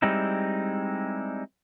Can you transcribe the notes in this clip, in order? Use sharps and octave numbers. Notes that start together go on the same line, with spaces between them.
G3 G#3 C4 D#4 E4